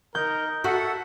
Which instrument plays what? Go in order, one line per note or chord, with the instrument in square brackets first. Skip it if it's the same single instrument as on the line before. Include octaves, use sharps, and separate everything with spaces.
[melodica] D#4 [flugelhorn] A#4 [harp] G6
[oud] F#4 [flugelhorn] A4 [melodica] E5 F#5